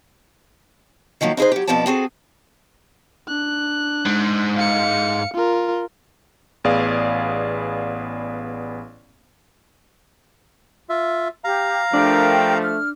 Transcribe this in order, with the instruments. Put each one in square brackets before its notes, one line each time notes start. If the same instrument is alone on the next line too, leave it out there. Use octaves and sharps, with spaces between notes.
[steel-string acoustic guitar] D#3 F3 F#3 A#3
D#4 E4 G#4 B4 C5
F#3 G4
F2 B2 F3 B3 D5 A5
C4 F#4 G#4 A4
[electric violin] D4 F#6
[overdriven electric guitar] G#2
[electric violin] F5 C#7
F4 A#4
[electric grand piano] A1 B3 G#4 D5 F5
[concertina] F4 E5
[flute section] G4 [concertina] F5 A#5
[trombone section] F3 A3 [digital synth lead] D4 [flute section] G4 A#4 G5
[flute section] F6